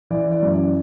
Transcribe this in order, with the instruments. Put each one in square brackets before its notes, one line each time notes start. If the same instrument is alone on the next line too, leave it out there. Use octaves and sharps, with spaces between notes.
[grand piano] E3 D5
D5
F#2
D5